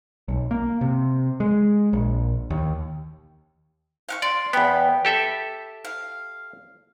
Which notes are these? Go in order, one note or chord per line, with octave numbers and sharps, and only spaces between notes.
B1
A#3
C3
G#3
A#1
D#2
F5 F#5 C#6
D5 C6
E2 B3 G5 B5
G4 A4 E5
F5